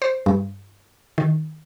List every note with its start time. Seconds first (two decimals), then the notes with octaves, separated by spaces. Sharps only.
0.02 C5
0.26 G2
1.18 D#3